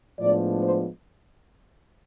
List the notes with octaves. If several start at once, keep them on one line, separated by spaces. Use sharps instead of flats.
A2 F3 G#3 B3 D4 D5
C5